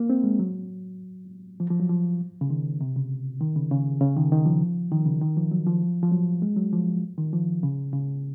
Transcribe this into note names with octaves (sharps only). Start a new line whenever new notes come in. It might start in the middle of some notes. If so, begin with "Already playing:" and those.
Already playing: A#3
C4
G#3
F#3
F3
F3
F#3
F3
C#3
D#3
C3
C#3
D#3
C#3
C#3
C#3
D#3
D#3
F3
D#3
C#3
D#3
F3
F#3
F3
F3
F#3
G#3
F#3
F3
D#3
F3
C#3
C#3